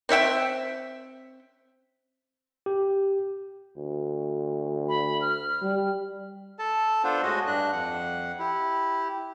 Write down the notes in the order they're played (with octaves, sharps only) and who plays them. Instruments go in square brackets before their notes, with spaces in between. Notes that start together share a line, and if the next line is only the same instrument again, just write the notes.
[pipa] C4 C#5 E5 G5
[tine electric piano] G4
[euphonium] D2
[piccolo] B5
F6
[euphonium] G3
[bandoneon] A4 A5
B3 D4 F4 A4 C5
A2 G#3 F#4 D#5
G2 D4 F#6
F2 F#5
E4 G4